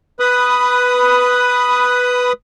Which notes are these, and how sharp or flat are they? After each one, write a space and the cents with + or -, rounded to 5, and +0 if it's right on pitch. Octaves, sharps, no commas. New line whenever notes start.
B4 +0 B5 +15 D#6 +0